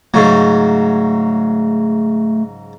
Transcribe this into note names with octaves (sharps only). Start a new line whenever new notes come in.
G#2 C#3 F#3 A3